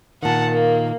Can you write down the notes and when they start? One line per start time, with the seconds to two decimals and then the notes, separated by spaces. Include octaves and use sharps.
0.23 A#2 D#3 F#5 A5
0.51 A#3